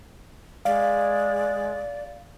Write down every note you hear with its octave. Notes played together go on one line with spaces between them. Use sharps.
G#3 D5 F5